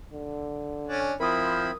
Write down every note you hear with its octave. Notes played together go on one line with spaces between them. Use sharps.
D3
C#4 D4
F3 C4 E4 A#4 B5 D#6